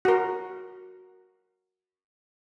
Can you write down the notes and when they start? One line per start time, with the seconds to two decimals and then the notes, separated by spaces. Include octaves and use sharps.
0.05 F#4 A#4